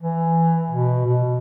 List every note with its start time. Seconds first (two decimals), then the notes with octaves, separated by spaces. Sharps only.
0.01 E3
0.71 B2
1.06 B2